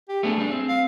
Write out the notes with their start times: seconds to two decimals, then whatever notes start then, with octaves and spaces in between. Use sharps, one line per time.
0.09 G4
0.23 A3 B3 D4 G#4
0.38 G3 D4
0.52 C4
0.68 F5